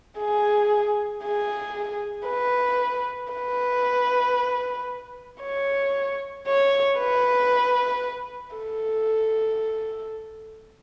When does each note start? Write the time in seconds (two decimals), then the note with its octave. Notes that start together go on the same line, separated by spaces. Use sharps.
0.19 G#4
1.24 G#4
2.27 B4
3.33 B4
5.42 C#5
6.47 C#5
6.99 B4
8.57 A4